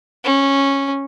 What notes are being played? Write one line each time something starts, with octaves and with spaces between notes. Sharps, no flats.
C#4